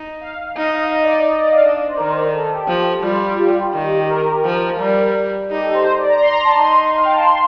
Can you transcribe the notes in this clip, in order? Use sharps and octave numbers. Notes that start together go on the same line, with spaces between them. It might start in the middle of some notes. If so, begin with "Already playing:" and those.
Already playing: D#4
F5
D#4 D#5
D5
D#5
D5
F5
D4 D#5
D5
C5
D#3 A#4
A4
G4
F3 G4
G3 F4
G4
D#3
A#4
F3
G3
D#4 G4
A4
C5
C5
D5
A#5
C6
A#5
A5
D#4 C6
F5
G5
A5
A#5
C6